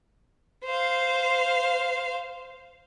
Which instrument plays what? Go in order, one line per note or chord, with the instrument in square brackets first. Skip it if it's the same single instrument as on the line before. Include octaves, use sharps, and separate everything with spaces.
[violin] C5 F5